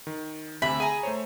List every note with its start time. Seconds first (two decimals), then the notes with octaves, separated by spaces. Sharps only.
0.07 D#3
0.62 D2 C3 E5 B5
0.80 G#4 G#5 A#5
1.03 A3 C5 C#5